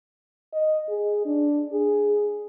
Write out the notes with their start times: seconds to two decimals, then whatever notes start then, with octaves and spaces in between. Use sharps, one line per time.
0.54 D#5
0.89 G#4
1.26 D4
1.73 G#4